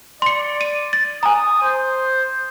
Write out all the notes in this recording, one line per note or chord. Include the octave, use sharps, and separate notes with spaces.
D5 C6 C#7
D#7
A6
G#5 A#5 D#6
C5